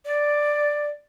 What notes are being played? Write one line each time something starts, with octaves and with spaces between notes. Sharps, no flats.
D5